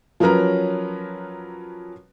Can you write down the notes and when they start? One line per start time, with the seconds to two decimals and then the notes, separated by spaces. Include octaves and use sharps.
0.20 F3 F#3 C#4 A#4 B4 A#5